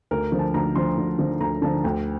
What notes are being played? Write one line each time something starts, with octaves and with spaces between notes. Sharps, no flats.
D2 A#4
D3 F3
A5
D2 A#5
D3 F3 C6
D2
D3 F3
D2 A#5
D3 F3 A5
D2 G5